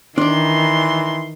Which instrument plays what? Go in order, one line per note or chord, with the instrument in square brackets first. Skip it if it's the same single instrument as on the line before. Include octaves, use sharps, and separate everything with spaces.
[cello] D#3 [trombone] E3 [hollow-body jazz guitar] D4 D5 [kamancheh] C6